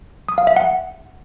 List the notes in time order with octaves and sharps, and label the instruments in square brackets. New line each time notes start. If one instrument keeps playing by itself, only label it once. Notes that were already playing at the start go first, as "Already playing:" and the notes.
[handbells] D#6
F5
E5
F#5